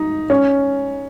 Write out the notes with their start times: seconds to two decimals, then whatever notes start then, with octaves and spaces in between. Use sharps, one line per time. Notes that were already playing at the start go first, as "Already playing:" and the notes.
Already playing: D#4
0.30 C#4